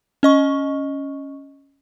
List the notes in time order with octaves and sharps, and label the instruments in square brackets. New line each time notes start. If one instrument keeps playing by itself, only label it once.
[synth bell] C#4 D#5 C#6